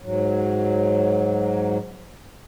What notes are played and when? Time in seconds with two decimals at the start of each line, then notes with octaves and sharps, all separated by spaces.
0.02 G#2 F#3